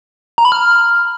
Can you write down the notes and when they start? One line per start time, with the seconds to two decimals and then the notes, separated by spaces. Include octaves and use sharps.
0.38 A#5
0.45 B5
0.52 F6